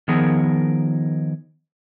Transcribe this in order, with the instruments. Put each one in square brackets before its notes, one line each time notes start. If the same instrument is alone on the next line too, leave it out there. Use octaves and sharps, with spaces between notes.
[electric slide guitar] D#3 F3 B3 G#4 A#4